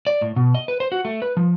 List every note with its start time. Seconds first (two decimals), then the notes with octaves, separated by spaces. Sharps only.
0.07 D5
0.21 A2
0.36 B2
0.55 D#5
0.68 B4
0.80 C5
0.92 F#4
1.05 A3
1.22 B4
1.37 F3